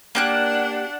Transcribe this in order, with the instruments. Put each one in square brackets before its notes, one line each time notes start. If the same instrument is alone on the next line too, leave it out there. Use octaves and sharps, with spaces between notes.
[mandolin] A#3 G4 F#6 [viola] D4 F#5